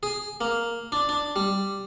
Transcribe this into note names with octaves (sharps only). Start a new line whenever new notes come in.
G#4
A#3
D4
D4
G3